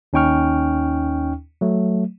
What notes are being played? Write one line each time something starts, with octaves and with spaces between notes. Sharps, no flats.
D#2 C#4 D#4 G5 C#6 F6
F#3 A3